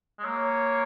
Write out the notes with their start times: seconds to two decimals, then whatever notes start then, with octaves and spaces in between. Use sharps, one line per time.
0.19 G#3
0.25 A#3 C#5